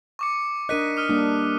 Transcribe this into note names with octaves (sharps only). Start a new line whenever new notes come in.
C#6 D6 C#7
D4 A#4 D#5 F#6 B6 D#7
D#6 F6 D#7
G3 A#3 D4